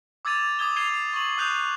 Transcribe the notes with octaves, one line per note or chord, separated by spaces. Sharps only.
D6 E6 G#6 A6 D#7 F7
D6 D#6 G#6 G7
G#6 C7 D#7 F7 G7
C#6 F#7
D#6 F#6 G6 C7 F7